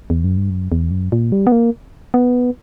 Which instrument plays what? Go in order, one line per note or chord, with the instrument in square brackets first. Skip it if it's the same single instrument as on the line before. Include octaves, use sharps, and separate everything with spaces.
[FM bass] E2
F#2
G2
F#2
E2
F#2
A#2
G3
B3
A#3
B3